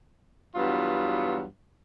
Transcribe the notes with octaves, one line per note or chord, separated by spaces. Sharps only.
E2 G2 F#3 B3 F4